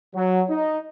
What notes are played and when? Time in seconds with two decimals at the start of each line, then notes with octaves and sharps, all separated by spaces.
0.14 F#3
0.49 D#4